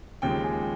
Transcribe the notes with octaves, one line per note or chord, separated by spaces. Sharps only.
D#2 C#3 F3 G#3 G5
G#5